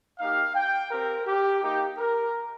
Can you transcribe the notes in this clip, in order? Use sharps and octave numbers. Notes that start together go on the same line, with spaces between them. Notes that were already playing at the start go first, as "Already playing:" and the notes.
A#3 D#4 G4 F5
G5
C4 G4 A#4
G4
A#3 D#4 G4
A#4